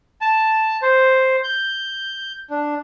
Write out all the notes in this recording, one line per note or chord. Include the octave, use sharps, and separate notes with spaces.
A5
C5
G6
D4